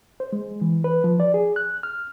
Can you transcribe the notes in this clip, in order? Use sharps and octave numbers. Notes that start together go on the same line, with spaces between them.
C5
G#3
E3
B4
F3
D5
G#4
F#6
F6